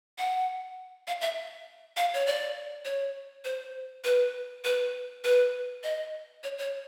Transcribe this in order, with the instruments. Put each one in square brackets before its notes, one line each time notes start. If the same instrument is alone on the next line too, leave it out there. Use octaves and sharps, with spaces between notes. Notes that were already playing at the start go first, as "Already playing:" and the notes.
[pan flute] F#5
F5
E5
F5
C#5
D5
C#5
C5
B4
B4
B4
D#5
C#5
C#5